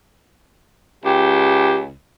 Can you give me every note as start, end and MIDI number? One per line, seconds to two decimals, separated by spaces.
1.05 1.94 37
1.05 1.78 67